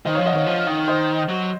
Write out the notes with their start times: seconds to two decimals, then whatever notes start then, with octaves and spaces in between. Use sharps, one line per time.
0.05 D#3 C5 D#5
0.15 F3 C#5 F5
0.26 D#5 F#5
0.33 D#3 C#5 F5
0.46 F3
0.67 D#3
0.88 C5 D#5
1.29 F#3